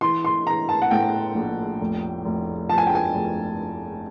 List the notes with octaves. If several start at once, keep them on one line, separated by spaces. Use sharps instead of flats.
E3 C6
C6
E3 A#5
A5
F#5
A2 G5
A#1
F1
F1
F3 A5
G#5
G5
G#5
F1